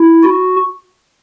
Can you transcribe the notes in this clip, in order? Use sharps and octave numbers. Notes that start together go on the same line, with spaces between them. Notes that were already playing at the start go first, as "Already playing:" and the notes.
Already playing: E4
F#4